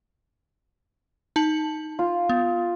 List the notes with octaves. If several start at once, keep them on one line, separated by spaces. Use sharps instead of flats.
D#4 A5 F#7
F4
B3